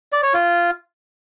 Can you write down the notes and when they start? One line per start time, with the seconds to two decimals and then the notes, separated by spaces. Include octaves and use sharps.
0.12 D5
0.23 C#5
0.34 F4